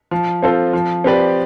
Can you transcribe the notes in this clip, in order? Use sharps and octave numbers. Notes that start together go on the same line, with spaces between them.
F3
C4 F4 A4 C5
F3
C4 G4 B4 D5